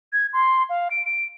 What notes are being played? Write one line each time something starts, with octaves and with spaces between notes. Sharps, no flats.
G#6
C6
F5
D7
D7